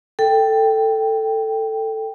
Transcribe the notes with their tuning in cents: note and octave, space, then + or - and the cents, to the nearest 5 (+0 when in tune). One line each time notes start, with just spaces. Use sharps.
A4 +10 G5 +0